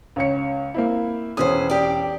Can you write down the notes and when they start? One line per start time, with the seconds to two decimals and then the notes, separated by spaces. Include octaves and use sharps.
0.16 C#2 C#5 C#7
0.74 A#3 C4 E4
1.37 E1 C#4 G#4 B4 C5 D#6
1.70 G4 D5